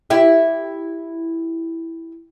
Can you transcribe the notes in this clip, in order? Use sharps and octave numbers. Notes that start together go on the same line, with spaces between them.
E4 G4